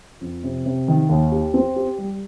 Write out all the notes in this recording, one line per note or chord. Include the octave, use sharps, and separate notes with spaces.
F2
C3
C3
D#3
D#2
G4
C4
G4
G3